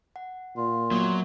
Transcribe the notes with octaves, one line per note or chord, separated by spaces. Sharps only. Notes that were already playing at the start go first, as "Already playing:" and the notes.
F#5
A#2 F4
F#3 A#3 B3